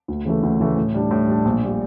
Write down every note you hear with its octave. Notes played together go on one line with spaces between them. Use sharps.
D2
C#3 E3 A3
D2
C#3 E3 A3
A2
G3 D4
A2
G3 D4
A#1
A#2 G3